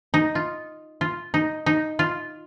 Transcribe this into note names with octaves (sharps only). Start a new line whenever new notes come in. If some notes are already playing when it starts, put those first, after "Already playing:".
D#4
F4
F4
D#4
D#4
F4